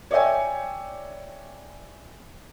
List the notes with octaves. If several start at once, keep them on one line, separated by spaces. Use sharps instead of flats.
C#5 D5 E5 G5 G#5